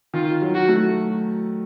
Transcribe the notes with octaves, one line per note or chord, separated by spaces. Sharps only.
D#3 F4
F#3
F#4
A3